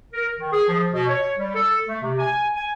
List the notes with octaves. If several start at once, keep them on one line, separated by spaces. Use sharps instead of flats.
A#4
D#3
G#4
F3
B2
C#5
G3
A4
A3
C3
G#5
G#5